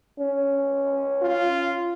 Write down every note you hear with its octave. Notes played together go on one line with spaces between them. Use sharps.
C#4
F4